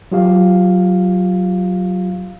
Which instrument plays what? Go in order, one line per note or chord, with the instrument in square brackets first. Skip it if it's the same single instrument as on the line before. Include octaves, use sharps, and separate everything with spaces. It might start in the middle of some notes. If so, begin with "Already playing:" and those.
[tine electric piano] F#3 F4 G4 F5